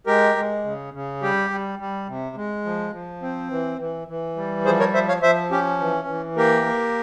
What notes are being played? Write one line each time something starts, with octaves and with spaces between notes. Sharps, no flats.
G#3 G4 A#4
G#3
C#3
C#3
G3 G4
G3
G3
C3
G#3
F3
F3
C4
E3
E3
E3
G3
F3 G#4 C5
A#4 C#5
F3 C5 E5
C#5 F5
F3 C5 E5
C#4 G4
E3
E3
A#3 G4 A#4
A#3